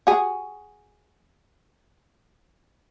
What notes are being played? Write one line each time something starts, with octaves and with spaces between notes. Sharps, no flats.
F#4 G#4